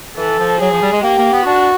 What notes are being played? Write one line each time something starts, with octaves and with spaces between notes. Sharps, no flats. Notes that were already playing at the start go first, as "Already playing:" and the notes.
E3 A4
F3
F#3 G#4
F3
G3
G#3
A#3 G4
A#3
B3
D4 F#4